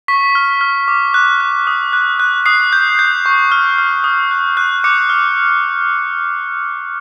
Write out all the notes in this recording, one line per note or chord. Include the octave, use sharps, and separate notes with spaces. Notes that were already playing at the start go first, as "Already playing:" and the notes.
C#6 B6
F6
F6
D6
F#6
F#6
D#6
F#6
F#6
D#6 C7
G6
G6
C#6
F6
F6
D#6
F#6
F#6
D6 C#7
F6